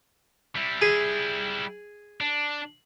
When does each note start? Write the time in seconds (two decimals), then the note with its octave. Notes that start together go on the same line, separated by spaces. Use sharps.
0.56 G3 E4
0.82 G#4
2.21 D4